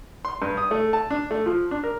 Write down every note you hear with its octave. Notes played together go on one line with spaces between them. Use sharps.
C6
G2
D#6
A3
A5
D4
A3
F3
D4
A#4